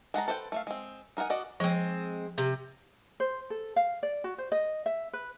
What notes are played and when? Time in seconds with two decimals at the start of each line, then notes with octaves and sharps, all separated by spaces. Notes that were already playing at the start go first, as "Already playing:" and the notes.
0.14 G#3 F#5 A5 A#5
0.28 A4 B4 C5 E5 G5
0.52 A3 E5 F5
0.67 G#3 C4
1.17 D#4 A#4 C5 F#5 G#5
1.30 F#4 D5 D#5
1.60 F3 G#3 C4
2.38 C3
3.20 C5
3.50 A4
3.76 F5
4.03 D5
4.24 F#4
4.38 C5
4.52 D#5
4.86 E5
5.13 B4